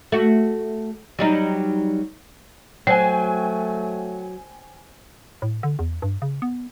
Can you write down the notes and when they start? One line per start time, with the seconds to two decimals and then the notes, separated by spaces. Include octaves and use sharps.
0.12 A3 F#4
1.19 F#3 G3 D#4
2.87 F#3 A3 C5 G5 G#5
5.42 A2
5.63 D3
5.79 E2
6.02 G2
6.22 C#3
6.42 B3